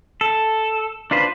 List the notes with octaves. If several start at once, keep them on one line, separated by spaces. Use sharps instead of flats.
A4
D4 F4 B4 C5